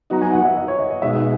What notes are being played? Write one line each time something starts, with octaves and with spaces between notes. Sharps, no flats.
F#3 B3 D#4 F#4 A#5
G#5
F#5
E5
D#5
C#5
D#5
D#5
B2 G#3 D#4 F#4 E5